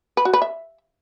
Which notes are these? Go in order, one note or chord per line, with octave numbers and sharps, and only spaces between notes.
B4
F#4
B4
E5